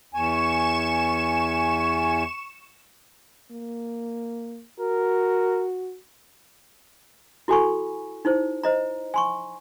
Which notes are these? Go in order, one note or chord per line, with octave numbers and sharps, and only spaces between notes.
E2 G#5 C#6 E7
A#3
F#4 A#4
E4 F#4 A4 G#5 B5 C#6
D#4 E4 C5
C5 D#5 A#5
G#5 C6 C#6